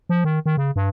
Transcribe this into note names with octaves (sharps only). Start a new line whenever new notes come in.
F3
D#3
D#3
C#3
G2